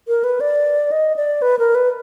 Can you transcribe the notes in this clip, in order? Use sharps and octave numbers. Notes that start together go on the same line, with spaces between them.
A#4
B4
D5
D#5
D5
B4
A#4
B4